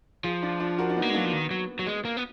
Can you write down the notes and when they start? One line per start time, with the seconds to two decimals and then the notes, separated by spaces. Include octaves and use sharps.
0.24 F3 F4 G#4
0.42 D4 F4
0.60 D4 F4
0.78 F#4 A#4
0.90 D4
0.96 B3 D#4
1.02 A#3
1.10 G#3
1.14 F#3 A#3 D4
1.25 F3
1.33 D#3 B3
1.51 F#3
1.79 F#3
1.87 G#3
2.05 A#3
2.17 B3